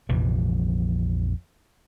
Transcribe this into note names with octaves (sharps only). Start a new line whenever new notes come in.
A#1 F2 C3 E3